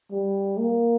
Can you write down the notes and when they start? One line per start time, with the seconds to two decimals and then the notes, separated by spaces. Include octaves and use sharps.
0.11 G3
0.58 A#3